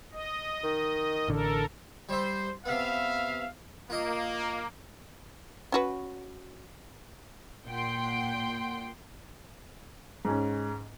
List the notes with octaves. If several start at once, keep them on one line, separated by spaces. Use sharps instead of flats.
D#5
D#3
A1 D3 A4 A#4
G3 C5 E5
C3 B3 E5 F5
A#3 F4 D#5
C#4 F#4 B4
A#2 F#5 G5 C6
G#2 C#4